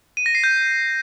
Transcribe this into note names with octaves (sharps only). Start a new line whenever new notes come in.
D#7
A#6
C7
G6